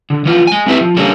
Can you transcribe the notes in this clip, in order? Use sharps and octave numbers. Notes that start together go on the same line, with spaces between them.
D3
E3 F3 B3 F4
G#3 G#5
A3 C4 E4 G4 B4 E5
F3
D3 G3 A#3 C#4 D4